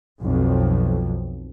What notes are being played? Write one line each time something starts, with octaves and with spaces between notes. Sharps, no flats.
B1 F2